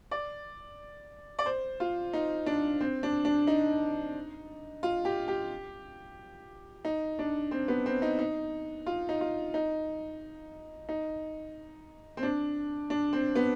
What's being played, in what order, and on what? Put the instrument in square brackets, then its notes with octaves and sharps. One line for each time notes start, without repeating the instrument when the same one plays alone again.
[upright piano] D5
D5
C5
F4
D#4
D4
C4
D4
D4
D#4
F4
G4
G4
D#4
D4
C4
B3
C4
D#4
D#4
F4
D#4
F4
D#4
D#4
C4
D4
D4
C4
B3